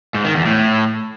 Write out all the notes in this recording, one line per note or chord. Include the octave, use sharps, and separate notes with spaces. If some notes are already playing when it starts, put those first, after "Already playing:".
G#2
D#3
E2
A2